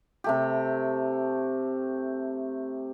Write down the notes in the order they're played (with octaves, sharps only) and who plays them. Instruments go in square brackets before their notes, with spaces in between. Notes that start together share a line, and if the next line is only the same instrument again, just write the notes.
[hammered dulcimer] C3 A3 G4